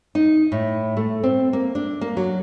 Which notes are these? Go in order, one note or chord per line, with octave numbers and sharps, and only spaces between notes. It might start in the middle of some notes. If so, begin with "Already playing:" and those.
D#4
A2
A3
C4
A#3
D4
A#3
F#3